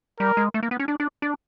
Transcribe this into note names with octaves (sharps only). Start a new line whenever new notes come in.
G3 A#4
G#3
A3
A#3
B3
C#4
D4
D4
D4